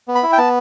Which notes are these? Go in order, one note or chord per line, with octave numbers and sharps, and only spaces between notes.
B3
B5
E4
G5
B3 A5